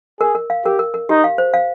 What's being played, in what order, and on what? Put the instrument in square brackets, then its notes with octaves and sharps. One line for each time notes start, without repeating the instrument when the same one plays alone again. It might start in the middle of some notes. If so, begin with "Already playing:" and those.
[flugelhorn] G#4 [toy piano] A#4
[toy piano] A#4
F5
[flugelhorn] G4 [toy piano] A#4
[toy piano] A#4
A#4
[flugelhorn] D#4 [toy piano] G4
[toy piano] F5
C5
F5